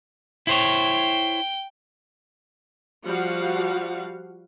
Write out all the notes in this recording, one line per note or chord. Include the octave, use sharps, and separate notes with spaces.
E4 C5 C#5 G5
F3 G3 F#4 F5 F#5